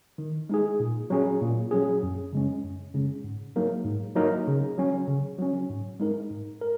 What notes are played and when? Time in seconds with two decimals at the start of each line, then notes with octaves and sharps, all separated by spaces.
0.18 D#3
0.49 G#3 D#4 G#4
0.80 A#2
1.10 F#3 C#4 G#4
1.42 A#2
1.71 F#3 C#4 G#4
2.03 F#2
2.33 C#3 G#3 C#4
2.64 F#2
2.94 C#3 G#3 C#4
3.24 G#2
3.56 F#3 A#3 D#4 A#4
3.85 G#2
4.16 F#3 A#3 D#4 A#4
4.47 C#3
4.78 F#3 C#4
5.08 C#3
5.38 F#3 C#4
5.69 G#2
6.00 G#3 D#4 A#4
6.30 G#2
6.61 A#4